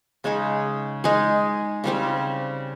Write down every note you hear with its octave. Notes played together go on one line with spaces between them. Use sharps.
C#3 G#3 D#4 G#4
G#3 D#4 G#4
C#3 G3 C4 G4